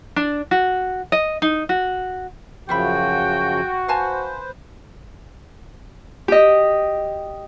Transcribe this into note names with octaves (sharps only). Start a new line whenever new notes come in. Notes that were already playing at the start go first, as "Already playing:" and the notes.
D4
F#4
D#5
D#4
F#4
F#2 C#3 F3 F4 F#4 E5 G5 B5
B4 C5 F5 G#5 A5
G4 D#5